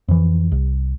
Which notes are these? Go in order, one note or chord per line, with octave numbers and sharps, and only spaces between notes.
F2 E3
C2